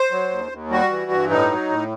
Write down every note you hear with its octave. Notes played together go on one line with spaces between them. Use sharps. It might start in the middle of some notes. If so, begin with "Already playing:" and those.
Already playing: C5
F#3
D#2
D#2
G3 F#4
E3
G2
A2 D#4
F#3
A2